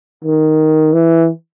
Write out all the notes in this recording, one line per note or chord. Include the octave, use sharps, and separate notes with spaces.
D#3
E3